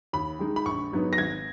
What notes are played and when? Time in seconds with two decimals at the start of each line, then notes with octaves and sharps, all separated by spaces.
0.13 D#2 B5
0.39 D#3 G#3 D#4
0.56 B5
0.66 A#1 C#6
0.92 G#2 F#3 B3 D#4
1.13 A#6
1.18 G#1 G#6